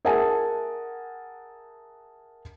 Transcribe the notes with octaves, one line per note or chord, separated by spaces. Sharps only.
G#4 A#4 E5 F#5 G#5 A5